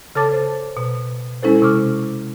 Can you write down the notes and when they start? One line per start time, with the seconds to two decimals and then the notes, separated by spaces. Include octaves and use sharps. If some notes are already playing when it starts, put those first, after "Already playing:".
0.15 C#3 A4 C#5 A5 D6 A6
0.32 C5
0.77 B2
1.43 G#3 C#4 E4 A4 C5
1.62 C3 C#6 D6 F6